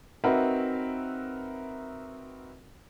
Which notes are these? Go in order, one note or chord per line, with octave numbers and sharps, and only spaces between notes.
C4 D#4 F#4 A#4 B4 E5